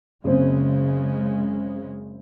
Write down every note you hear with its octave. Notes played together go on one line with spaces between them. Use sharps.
F#1 C#3 G#3 C4